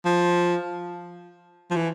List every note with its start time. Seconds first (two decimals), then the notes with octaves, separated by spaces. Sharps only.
0.05 F3
1.71 F3
1.76 E3